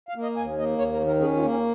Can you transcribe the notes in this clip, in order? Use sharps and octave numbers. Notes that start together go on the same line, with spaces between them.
F5
A#3
D#5
D#2 G#5
A#3 D#5
D#2 C#5
A#4
D#3
A#4
C#4 G#4
F4
A#3
C#4